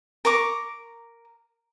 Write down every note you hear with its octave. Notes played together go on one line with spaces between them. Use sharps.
A#4 A#5 C#6 D6